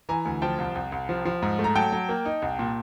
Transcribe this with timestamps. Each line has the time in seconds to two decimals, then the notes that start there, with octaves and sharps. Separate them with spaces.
0.09 E3 G#5 A#5
0.25 D2
0.42 F3 G5 A5
0.58 C2
0.75 C2
0.92 C2
1.09 F3
1.25 F3
1.42 G#2
1.59 A3
1.64 A#5
1.76 F#3 G5 A5
1.92 F#3
2.09 A#3
2.25 D#4
2.42 C2
2.59 A#2